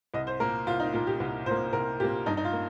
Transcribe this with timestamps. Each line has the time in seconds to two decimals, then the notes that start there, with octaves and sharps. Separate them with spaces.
0.14 C2 D#5
0.27 C5
0.40 A#2 A#3 A#4
0.67 C2 F4
0.80 D#4
0.93 A#2 A#3 F4
1.07 G4
1.20 C2
1.46 A#2 C5
1.51 A#3
1.73 C2 A#4
2.00 A#2 A#3 G4
2.26 G2 D#4
2.37 D#4
2.45 F4
2.53 A#3